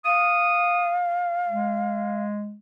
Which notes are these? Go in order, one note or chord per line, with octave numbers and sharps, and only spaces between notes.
F5 D#6
G#3